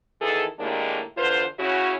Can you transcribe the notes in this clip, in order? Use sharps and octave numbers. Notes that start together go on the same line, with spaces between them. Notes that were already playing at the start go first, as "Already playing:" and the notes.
E2 D#3 E3 G#4 A4
D#2 A2 D#3 G#3 A#3 D4
E2 D3 F4 B4 C5
C#3 C#4 E4 F#4